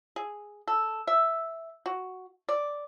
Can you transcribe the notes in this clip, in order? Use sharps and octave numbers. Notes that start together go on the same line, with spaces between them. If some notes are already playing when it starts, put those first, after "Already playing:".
G#4
A4
E5
F#4
D5